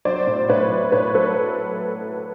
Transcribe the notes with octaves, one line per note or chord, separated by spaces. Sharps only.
F#3 C5 D5
A2
A2 B4 C#5
F#3
A2 B4 C#5
F#3 A4 B4